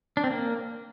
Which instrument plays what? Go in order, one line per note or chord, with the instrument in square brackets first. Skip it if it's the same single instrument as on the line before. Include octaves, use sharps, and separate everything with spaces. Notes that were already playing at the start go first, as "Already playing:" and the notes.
[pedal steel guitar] D4
C4
A#3